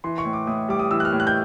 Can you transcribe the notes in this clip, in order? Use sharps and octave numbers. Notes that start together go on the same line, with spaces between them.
E3 C6
C#6
A2
D6
A2 D#6
G3 D6
D#6
E3 E6
F#6
F6
A2
F#6
G6